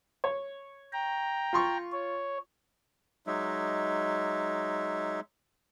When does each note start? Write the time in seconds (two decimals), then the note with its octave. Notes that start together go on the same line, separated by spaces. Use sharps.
0.24 C#5
0.93 G5 A#5
1.53 F4 C6 C#6
1.92 C#5
3.27 F#3 G#3 D#4 E5